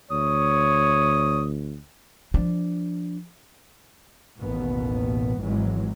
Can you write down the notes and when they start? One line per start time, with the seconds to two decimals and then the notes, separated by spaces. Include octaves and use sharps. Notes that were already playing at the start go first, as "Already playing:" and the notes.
0.11 D2 C#5 D#6
2.34 F3 D4
4.39 A1 D#2 B2 B3
5.39 G#1 G#2 E3 F#3 G#3